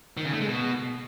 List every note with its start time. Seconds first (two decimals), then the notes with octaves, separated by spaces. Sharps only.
0.17 D#3
0.25 C#3
0.33 A3
0.41 G#3
0.49 B2